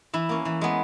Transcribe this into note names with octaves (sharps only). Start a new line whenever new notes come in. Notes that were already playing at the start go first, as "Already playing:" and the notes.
E3 E4
A#3 C#4
E3
G#3 B3